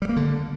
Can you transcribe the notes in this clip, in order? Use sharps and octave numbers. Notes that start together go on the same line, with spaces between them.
G3
A#3
D3